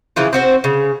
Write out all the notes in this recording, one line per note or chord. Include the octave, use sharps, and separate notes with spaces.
C#3 E3 F3 F4
C4 F#4 C5
C#3